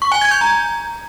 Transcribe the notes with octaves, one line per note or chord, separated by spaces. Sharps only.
C#6
G#5
G#6
G6
A#5